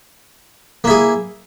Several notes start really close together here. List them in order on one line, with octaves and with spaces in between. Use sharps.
A#3 E4 G#4